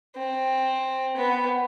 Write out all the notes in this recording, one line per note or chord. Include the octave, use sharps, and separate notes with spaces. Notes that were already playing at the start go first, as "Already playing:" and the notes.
C4
B3